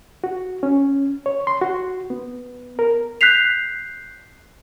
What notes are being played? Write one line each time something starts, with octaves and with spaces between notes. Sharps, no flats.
F#4
C#4
C#5
C6
F#4
B3
A#4
F#6 G6 B6 C7 F7